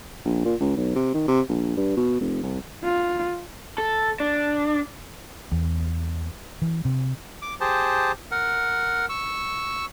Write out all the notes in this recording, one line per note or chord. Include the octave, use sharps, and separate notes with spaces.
A#1
A#2
C#2
B1
C3
D#3
C3
A#1
G2
B2
F1
C2
F4
A4
D4
E2
E3
C3
D6
G4 G#4 C5 A5
A#4 F#5
C#6 E6